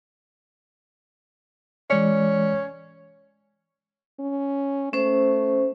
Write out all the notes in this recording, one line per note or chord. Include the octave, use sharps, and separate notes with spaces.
E3 G#3 C#4 D5
C#4
A3 C#4 C5